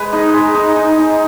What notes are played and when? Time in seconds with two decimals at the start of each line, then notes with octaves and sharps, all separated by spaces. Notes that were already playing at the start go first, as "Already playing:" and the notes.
Already playing: G#3 B4
0.13 D#4
0.34 G#3
0.55 D#4
0.76 D#4
0.98 D#4